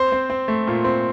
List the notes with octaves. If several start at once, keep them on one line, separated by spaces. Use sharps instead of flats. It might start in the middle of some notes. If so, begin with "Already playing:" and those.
Already playing: C4 C5
C4
C4
A3
A#2
C4